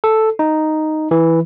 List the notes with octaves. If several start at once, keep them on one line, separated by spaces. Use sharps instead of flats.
A4
D#4
E3